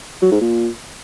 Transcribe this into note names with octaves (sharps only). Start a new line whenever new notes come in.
F#3
G#2
A#2